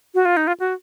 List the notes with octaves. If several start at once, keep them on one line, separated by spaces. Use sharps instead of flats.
F#4
F4
D#4
F4
F#4